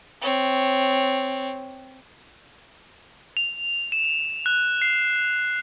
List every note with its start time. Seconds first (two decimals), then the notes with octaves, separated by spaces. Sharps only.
0.21 C4 C#5
3.37 F7
3.92 E7
4.46 F#6
4.82 C7